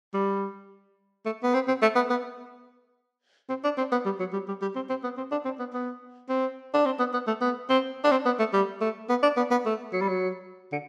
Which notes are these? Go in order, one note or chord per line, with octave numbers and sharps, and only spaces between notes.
G3
A3
B3
C4
C4
A3
B3
B3
C4
D4
C4
B3
G3
F#3
G3
G3
G3
C4
C4
B3
C4
D4
C4
B3
B3
C4
D4
C4
B3
B3
A3
B3
C4
D4
C4
B3
A3
G3
A3
B3
D4
B3
B3
A3
F#3
G3
F#3
D3